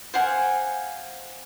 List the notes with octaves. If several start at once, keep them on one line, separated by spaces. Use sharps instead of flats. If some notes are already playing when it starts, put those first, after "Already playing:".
C5 F5 F#5 G#5